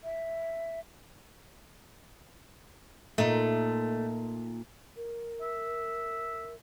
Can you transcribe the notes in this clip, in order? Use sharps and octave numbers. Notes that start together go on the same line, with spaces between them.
E5
A#2 A3 D#4
A#4
E5